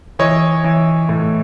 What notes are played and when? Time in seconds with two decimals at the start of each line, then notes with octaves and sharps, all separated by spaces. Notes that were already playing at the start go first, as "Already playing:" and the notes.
0.19 E3 C#5 D#5
0.64 E3
1.09 A2